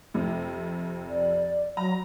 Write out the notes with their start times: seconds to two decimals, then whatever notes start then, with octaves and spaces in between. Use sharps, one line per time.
0.14 F2 C3
1.09 D5
1.77 F#3 A#5